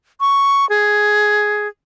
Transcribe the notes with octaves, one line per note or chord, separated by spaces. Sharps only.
C#6
G#4